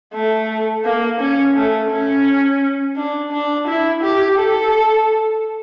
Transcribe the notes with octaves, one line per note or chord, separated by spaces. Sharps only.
A3
A#3
C#4
A3
C#4
D4
D4
E4
G4
A4